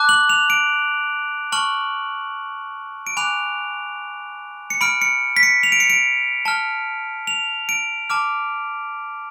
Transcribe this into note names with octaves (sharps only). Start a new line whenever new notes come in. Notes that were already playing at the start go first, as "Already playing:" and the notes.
Already playing: A5 D6 F#6
F#7
F7
D7
A5 C#6 F6 F#7
D7
G#5 B5 D6 F#6 F7
C#7
B5 F6 D7
C#7
B6
C#7
F7
D7
C#7
D7
A5 F6
F7
D7
A5 D6 F6